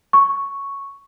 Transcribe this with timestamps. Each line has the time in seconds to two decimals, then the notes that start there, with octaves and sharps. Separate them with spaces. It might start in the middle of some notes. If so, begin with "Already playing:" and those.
0.13 C#6